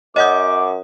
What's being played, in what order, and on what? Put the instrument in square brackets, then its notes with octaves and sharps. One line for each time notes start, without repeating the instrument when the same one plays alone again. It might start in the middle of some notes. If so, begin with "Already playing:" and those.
[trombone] F#2 [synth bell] C#5 F#5 D#6 [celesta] D#5 G6 [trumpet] D6